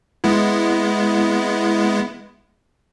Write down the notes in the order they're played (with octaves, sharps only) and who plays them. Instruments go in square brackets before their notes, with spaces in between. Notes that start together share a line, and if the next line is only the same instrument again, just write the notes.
[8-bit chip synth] G#3 B3 E4